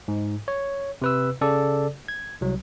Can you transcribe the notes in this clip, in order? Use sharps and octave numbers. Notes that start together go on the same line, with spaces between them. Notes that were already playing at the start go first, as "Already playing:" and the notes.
G#2
C#5
C3 B4 E6
C#3 A4 D5
G#6
C2 F#3